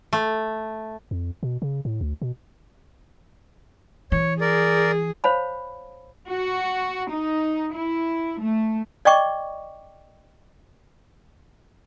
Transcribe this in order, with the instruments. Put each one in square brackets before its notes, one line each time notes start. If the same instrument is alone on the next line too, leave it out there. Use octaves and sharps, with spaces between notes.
[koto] A3
[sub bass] F2
B2
C#3
A2
D2
B2
[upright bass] E3 [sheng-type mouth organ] C#5
[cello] G#4 [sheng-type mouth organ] A#4 D5
[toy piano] C5 C#5 F5 A5 B5
[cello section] F#4
D#4
E4
A3
[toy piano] D5 D#5 G5 C#6 D6